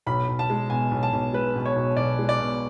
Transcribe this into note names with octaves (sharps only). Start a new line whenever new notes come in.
B1 B5
B1
A5
G#3
B2 G#5
B1
A5
B1
G#3 B4
B2
C#5
B1
B1 D5
G#3
D5
B2